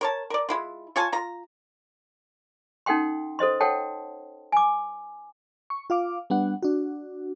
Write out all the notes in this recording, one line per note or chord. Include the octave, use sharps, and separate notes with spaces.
A#4 C#5 A5
A#4 D5
G#3 E4 F4
F4 C#5 G#5 A5
F4 A#5
C#4 D#4 A4 F#5 G5 C6
A4 C5 D#5 C6
A4 C#5 F#5 G5 A5
G#5 D6
C#6
F4 F5 D6
G3 B3 D4 F#5
D4 F#4